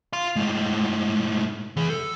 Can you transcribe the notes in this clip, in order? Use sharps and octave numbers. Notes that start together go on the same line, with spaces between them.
F5 C6
A2 G#3
E3 G#4
A4